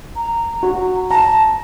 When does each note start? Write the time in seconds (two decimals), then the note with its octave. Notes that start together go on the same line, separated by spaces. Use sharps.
0.16 A#5
0.63 F#4
1.11 A5 A#5